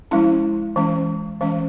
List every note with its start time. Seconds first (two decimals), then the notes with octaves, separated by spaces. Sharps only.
0.11 F3 G#3 C#4 E4
0.76 E3 G#3 C#4
1.41 E3 G#3 C#4